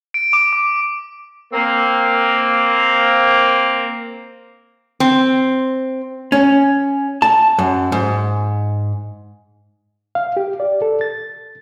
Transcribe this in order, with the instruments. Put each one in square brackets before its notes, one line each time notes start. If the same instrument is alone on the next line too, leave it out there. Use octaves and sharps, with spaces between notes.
[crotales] D7
D6
D6
[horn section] A#3 C4
[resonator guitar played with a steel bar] C4
[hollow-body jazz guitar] C#4
A5
F#2
G#2
[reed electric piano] F5
G4
D5
A4
A6